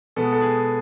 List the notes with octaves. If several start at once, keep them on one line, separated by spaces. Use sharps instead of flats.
B2 G#3 B3 A4
A4
G#4